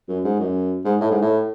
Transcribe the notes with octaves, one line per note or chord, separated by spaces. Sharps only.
F#2
G#2
F#2
G#2
A2
G#2
A2